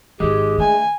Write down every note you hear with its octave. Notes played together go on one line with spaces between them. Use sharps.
G#1 G#2 G#3 G4
D3 A3 G#5